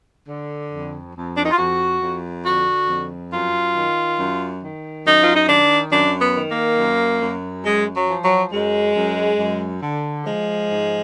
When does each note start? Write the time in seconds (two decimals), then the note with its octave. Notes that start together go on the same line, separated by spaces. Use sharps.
0.29 D3
0.71 F2
1.15 F2
1.37 D4
1.44 D#4
1.51 F4
1.58 F2 F#4
2.02 F2
2.45 D3 F#4
2.89 F2
3.32 F#2 F4
3.75 D#3
4.19 F#2
4.62 D#3
5.06 F#2 D#4
5.22 F4
5.36 D#4
5.49 D#3 D4
5.92 F#2 D4
6.21 B3
6.35 D#3
6.50 A#3
6.78 F#2
7.22 F#2
7.65 F#2 G#3
7.95 F#3
8.09 F3
8.23 F#3
8.52 F#2 G#3
8.96 F#2
9.39 F#2
9.82 D3
10.26 F3 G#3
10.69 G#2